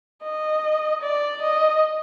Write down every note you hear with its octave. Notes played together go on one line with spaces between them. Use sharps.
D#5
D5
D#5